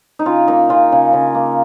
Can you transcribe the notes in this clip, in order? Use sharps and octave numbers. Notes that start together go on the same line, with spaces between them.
D#4
C#3 F4
A#3 D#4
C#3 F4
C#3
C#3
A#3